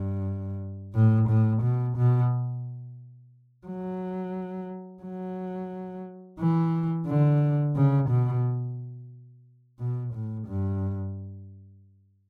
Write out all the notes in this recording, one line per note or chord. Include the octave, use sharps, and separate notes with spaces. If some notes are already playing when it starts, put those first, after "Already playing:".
Already playing: G2
A2
A2
B2
B2
F#3
F#3
E3
D3
C#3
B2
B2
A2
G2